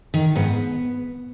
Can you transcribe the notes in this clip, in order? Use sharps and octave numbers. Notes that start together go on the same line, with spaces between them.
D#3
G#2 B3